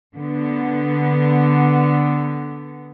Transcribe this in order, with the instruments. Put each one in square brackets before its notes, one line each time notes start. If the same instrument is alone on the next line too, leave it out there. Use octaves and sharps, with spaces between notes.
[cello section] D3 B3